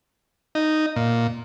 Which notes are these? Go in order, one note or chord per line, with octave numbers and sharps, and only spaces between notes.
D#4
A#2